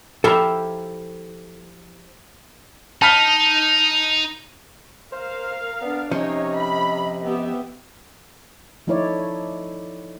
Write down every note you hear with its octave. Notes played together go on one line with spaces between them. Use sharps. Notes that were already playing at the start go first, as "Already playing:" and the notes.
F3 E4 G4 A4 A#5
D#4 A5 F6 B6
A#4 C5 F5
B3 D4 D5
C3 F3 C#4 D#4 C#5 D#5
B5
B3 G4 E5
F3 A3 D#4 E4 C#5 D5